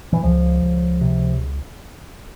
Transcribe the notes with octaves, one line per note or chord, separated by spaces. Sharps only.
E3
C#2 F3
C#2
C3